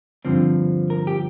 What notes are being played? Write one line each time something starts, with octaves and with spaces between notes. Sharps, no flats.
G2 D3 F3 C4
A#4
G4